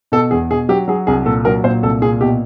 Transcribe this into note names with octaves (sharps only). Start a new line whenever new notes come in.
B2 A4
E2 G#4
B2 G#4
F#3 G4
F#3 G#4
C2 G#4
A#2 A4
F#3 A#4
A#2 C5
C2 A4
A#2 G#4
B2 G4